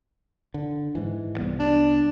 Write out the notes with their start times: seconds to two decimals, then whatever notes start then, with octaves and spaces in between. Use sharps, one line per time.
0.54 D3
0.95 G#2 E3
1.38 C2 G3 B3
1.60 D4